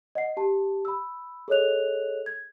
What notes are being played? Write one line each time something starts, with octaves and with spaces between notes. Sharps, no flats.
D#5 F#5 C7
G4 A5
B5 E6
G#4 A4 C#5 D#5 F#6 F7
G#6